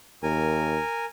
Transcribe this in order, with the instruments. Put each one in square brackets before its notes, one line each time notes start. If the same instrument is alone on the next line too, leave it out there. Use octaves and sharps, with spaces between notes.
[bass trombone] D#2 [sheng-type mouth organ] A#4 G#5